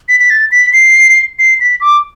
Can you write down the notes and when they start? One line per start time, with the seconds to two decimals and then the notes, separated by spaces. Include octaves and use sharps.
0.09 B6
0.20 B6
0.30 A6
0.52 B6
0.73 C7
1.39 C7
1.60 B6
1.81 D6